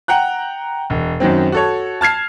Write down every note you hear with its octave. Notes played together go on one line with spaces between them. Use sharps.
F#5 G5 A#5 F#6
E1
F#2 D#3 F#3 C4
F#4 A4 C#5
A5 F6 G#6 C7